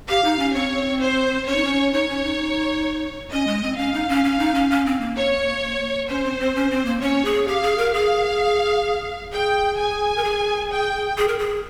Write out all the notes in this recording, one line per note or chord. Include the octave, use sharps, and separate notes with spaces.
G4 F5
D#4
C#4
C4 C#5
C5
C#4 C#5
D#4
C#4
D#4 C#5
C#4
D#4
C#4 D#5
G#3
C4
C#4 F5
D#4
C#4
C#4
D#4
C#4
C#4
C4
A#3
C#5
C#4 C5
C4
C4
C#4
C4
A#3
C#4 C#5
G#4
G4 F5
G#4
A#4
G#4 F5
G#4 G5
G#5
A#4
G#4
G5
G#4
A#4
G#4